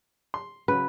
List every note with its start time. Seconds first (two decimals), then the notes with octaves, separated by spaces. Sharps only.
0.34 C6
0.68 C#3 F#3 B4